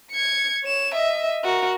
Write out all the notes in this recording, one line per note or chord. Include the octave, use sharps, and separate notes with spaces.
G#6 C#7
C#5 E7
D#5 E5
F#4 A#4